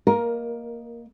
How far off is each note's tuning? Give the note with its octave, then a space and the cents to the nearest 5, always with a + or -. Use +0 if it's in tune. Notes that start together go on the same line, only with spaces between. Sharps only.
A#3 +0 A#4 +15 D#5 -5